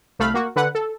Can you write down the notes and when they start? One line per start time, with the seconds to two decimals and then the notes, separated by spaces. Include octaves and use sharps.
0.19 C2 A3 F5 B5
0.34 A#3 F#4
0.56 D3 B4 F#5
0.75 A4